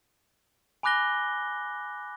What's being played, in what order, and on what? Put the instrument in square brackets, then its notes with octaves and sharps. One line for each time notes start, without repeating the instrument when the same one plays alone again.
[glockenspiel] G#5 B5 D6 F#6 A#6 G7